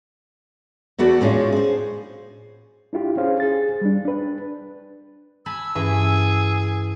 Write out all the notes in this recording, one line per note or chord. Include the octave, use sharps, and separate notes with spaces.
E2 A3 B3 F#4 A4 D5
A2 G#3 C#4 D4 F4
G#4 C5
D4 E4 F4 G4
C#4 G#4 C5 F5
G#4 A6
G3 D4
D4 B4
G#5 A5 B5 E6
G2 E3 C#4 G#4